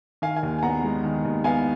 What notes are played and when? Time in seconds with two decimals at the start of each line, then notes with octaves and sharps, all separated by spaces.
0.22 D#3 F5 G#5
0.36 F5 G#5
0.43 D#2
0.59 G#5
0.63 B3 F#5 A#5
0.84 G#3
1.04 D#3
1.25 D#2
1.44 B3 F5 G#5